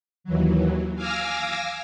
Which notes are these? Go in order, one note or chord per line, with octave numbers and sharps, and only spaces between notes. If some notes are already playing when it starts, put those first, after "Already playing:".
D#2 E3 F#3
F5 G#5 D6 E6 F6 A#6